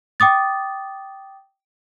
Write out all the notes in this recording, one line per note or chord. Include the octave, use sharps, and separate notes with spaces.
G5 D6 D#6 A6